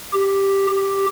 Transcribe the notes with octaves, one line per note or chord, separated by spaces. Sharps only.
G4
G4